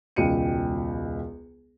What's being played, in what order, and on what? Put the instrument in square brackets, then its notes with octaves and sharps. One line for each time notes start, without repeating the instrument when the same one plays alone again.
[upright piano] E1 C#2 G5 C#7 D#7